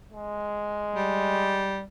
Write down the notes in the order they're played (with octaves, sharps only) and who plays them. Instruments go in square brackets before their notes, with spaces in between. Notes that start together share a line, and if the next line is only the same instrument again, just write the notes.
[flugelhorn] G#3
[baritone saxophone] G3